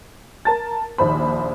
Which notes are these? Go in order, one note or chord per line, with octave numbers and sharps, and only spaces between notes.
A#4 A5 A6
A#1 D#2 C5 B5